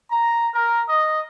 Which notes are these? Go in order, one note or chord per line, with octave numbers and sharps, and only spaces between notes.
A#5
A#4
D#5